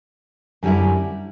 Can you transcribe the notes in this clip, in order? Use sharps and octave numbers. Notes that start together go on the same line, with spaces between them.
F#2 D3 G3 C#4 E4